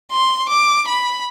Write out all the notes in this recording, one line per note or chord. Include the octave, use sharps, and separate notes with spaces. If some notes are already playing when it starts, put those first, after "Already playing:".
C6
D6
B5